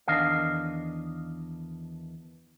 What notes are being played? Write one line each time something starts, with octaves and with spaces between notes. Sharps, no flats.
E2 D#3 D4 D#5 F5